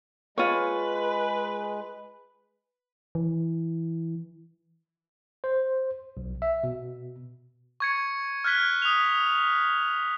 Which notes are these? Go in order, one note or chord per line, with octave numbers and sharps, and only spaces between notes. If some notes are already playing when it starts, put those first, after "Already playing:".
G#3 F4 B4 C#5
E3
C5
B1
E5
B2
C#6 G#6 C#7
F6 F#6 G#6 B6 G7
D#6 F7